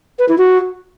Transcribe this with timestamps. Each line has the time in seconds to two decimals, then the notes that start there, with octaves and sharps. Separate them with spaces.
0.19 B4
0.29 E4
0.38 F#4